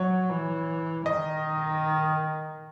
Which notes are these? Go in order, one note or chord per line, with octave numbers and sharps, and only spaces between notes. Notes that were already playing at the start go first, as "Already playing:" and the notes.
Already playing: F#3 C#5
E3
D#3 D#5